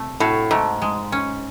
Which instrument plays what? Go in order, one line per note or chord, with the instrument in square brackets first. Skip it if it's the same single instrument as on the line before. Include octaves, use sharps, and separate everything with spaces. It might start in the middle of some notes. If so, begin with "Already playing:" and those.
Already playing: [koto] C3 A3
[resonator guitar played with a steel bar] A2 [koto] F#4
[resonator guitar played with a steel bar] G#2 [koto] A3
[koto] G#3
C#4